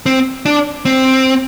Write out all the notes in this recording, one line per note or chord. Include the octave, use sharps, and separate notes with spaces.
C4
D4
C4